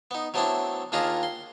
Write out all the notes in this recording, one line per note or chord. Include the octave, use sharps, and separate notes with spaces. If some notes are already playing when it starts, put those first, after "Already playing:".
B3 D#4
F#3 A3 B3 C4 D4 E4
D#2 D#3 D4 F4 G#4 A#5
C6